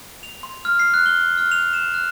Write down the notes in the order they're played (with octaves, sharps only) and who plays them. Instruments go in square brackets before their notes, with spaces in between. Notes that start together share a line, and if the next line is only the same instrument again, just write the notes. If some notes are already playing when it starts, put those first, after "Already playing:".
[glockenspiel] F7
C6
F6
C7
F#6
G7
F6
F7
E7
F#6